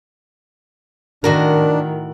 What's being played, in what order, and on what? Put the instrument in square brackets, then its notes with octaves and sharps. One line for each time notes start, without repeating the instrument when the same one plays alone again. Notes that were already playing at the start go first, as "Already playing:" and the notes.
[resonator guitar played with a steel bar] A2 F#4 A#4 [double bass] D#3 [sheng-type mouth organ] D4